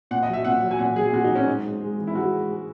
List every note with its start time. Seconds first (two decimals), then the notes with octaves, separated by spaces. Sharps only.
0.11 A#2 F#5
0.23 D#5
0.28 F#3
0.33 E5
0.45 A#2 F#5
0.62 F#3
0.71 G#5
0.79 A#2 F#5
0.96 F#3 G#4
1.13 A#2 F#4
1.24 D#4
1.29 F#3
1.36 C#4
1.47 G#2 D#4
1.64 G#2
1.81 G#3
1.98 E3
2.07 E4
2.15 G#2 F#4
2.32 G#2
2.49 G#3